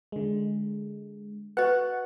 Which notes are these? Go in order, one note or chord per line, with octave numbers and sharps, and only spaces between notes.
D3 G#3
F#4 B4 D#5 F#5